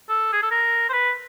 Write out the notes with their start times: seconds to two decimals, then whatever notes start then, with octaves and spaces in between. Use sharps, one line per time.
0.09 A4
0.33 G#4
0.42 A4
0.51 A#4
0.89 C5
0.93 B4